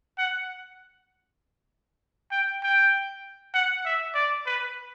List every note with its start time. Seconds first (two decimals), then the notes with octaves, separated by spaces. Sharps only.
0.18 F#5
2.32 G5
2.63 G5
3.54 F#5
3.85 E5
4.15 D5
4.46 B4